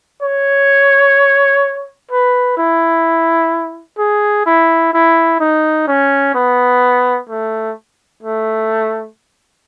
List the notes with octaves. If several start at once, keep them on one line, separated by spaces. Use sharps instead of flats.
C#5
B4
E4
G#4
E4
E4
D#4
C#4
B3
A3
A3